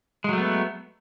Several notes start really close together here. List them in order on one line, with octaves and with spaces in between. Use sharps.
G#3 F#3 A3 B3